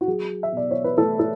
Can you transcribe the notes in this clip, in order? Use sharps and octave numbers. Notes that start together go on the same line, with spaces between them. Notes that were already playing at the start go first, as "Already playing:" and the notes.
F#4
F#3 G#4
E5
B2 D5
C#5
B4
A3 A4
A4